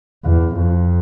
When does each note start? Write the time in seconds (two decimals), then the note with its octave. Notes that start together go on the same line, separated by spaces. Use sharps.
0.25 E2
0.56 F2